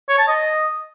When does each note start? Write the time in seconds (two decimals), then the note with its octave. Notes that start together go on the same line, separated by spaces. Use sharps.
0.09 C#5
0.18 A5
0.28 D#5